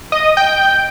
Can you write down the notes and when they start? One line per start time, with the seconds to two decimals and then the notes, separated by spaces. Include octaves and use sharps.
0.12 D#5
0.37 G5